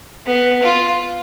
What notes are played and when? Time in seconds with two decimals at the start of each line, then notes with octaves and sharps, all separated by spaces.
0.26 B3
0.63 F4